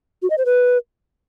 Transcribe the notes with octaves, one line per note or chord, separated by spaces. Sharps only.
F#4
D#5
C5
B4